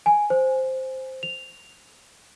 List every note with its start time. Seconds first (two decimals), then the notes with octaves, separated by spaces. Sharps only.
0.06 G#5
0.30 C5
1.23 F7